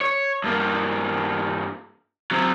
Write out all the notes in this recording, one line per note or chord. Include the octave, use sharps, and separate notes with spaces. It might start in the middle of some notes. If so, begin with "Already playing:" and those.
C#5
G2 A#3
F#3 C4